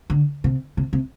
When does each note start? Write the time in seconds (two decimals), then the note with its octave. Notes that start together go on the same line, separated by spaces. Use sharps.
0.10 D3
0.44 C3
0.77 C3
0.93 C3